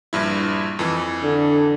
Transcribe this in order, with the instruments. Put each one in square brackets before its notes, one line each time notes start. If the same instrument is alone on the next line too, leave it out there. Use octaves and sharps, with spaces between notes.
[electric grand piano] A#1 G2 E4
F2 E3
[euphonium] D3